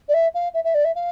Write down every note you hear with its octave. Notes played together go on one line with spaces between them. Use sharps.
D5
E5
F5
E5
E5
D5
E5
F5